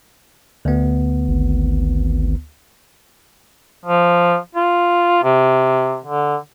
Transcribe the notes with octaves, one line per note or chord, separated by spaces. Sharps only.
D2 B3
G#1
F3
F4
C3
D3